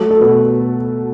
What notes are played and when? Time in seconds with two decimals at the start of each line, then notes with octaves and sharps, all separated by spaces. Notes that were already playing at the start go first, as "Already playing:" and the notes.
Already playing: F#3 A3 A4
0.10 A4
0.21 B2 B4